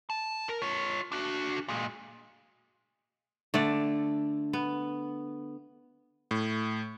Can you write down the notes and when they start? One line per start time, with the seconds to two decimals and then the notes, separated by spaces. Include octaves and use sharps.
0.10 A5
0.49 A#4
0.62 F4 C#5
1.12 D4 F#4
1.68 A#2 G#3
3.54 D3 A3 D5
4.53 B3
6.31 A2